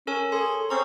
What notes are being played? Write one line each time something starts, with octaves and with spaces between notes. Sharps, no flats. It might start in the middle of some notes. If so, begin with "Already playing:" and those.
C#4 A4 A#4 G#5
G#4 A4 C#5 C6
C4 C#4 G#4 C5 A#5 C#6